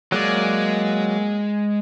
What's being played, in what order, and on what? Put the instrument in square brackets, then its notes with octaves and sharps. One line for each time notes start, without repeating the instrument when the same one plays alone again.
[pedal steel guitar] F#3 A#3 D5 [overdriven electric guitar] G#3